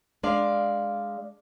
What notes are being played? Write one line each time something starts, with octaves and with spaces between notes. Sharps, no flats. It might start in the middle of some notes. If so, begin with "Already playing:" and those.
G#3 D4 D5 F5